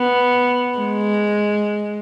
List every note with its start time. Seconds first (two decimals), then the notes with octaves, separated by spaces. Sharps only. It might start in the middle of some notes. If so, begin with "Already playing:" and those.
Already playing: B3
0.78 G#3